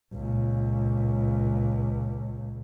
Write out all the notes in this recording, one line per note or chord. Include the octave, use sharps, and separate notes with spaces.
C#2 A#2